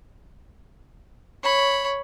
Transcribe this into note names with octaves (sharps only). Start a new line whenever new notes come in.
C#5 B5